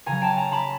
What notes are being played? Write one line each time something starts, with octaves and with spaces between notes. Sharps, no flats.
C#3 F#3 G#5 A#5
G5 A5
G#5 A#5
A5 B5